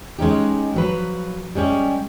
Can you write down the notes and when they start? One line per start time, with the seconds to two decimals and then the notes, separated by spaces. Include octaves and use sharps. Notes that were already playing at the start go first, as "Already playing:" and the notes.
0.19 G#3 C#4 D#4 G4
0.74 F3 F#3 B4
1.55 G3 G#3 C#4 G4